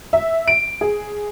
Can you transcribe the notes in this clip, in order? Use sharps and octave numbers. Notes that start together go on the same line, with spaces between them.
E5
D7
G#4